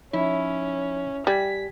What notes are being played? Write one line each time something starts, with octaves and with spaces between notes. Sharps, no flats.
F3 C#4 D#4 E4 C#5
G3 G#5 G#6 B6